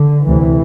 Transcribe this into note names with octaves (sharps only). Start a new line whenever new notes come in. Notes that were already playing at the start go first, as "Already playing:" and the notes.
Already playing: D3
D2 C3 E3